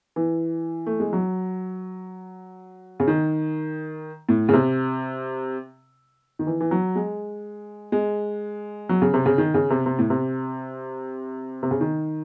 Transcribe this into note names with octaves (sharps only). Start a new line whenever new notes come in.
E3
A3
G#3
F#3
C#3
D#3
A2
C#3
C3
D#3
E3
E3
F#3
G#3
G#3
F#3
C#3
C3
C#3
D#3
C#3
C3
C3
A2
C3
C3
C#3
D#3